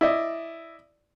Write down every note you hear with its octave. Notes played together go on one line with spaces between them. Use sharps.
E4 D5 D#5